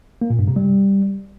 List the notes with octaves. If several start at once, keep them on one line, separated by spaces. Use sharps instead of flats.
A#3
A#2
G2
C3
G3